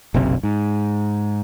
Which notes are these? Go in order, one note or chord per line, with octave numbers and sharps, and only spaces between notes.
F#1 B1 C3
G#2